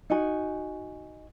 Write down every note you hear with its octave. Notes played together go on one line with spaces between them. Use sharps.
D#4 F#4 G#5